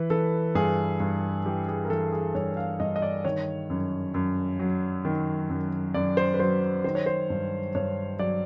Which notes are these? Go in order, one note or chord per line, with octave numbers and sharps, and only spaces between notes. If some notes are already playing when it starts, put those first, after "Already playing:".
Already playing: E3 B4
E3 A4
G2 G#4
G2
E3 G4
G#4
A#4
E3 A4
G#4
G2 C#5
F5
G2 D#5
D#5
D5
D#3 C#5
F#2
F#2
F#3
D#3
F#2
F#2 D5
C5
B4
F#3 C5
D#3 C5
C#5
C5
G2
G2 C#5
F#3 D5